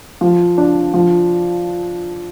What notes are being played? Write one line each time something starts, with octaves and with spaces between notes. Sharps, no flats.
F3
D4
F3